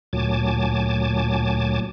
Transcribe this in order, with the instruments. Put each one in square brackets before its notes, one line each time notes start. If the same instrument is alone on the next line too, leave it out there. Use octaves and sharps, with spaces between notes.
[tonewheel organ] D2 A#2 F#3 G#5 A5 D6